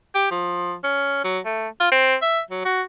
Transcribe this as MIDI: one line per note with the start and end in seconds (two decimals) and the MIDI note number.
0.15 0.28 67
0.31 0.75 53
0.84 1.21 61
1.24 1.39 54
1.45 1.68 57
1.80 1.91 65
1.92 2.15 60
2.22 2.40 76
2.50 2.61 54
2.65 2.82 66